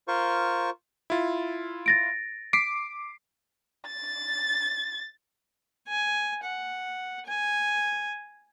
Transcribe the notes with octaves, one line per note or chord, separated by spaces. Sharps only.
F4 A#4 C5 C#6
E4 F4
A6 A#6 D7
D6 B6 C7 D7
A6
G#5
F#5
G#5